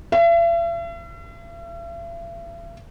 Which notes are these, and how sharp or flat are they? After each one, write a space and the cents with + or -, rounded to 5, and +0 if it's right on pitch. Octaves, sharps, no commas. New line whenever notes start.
E5 +45